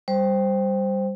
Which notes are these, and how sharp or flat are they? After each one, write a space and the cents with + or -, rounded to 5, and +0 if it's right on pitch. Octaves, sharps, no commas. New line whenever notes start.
G3 +0 C5 +0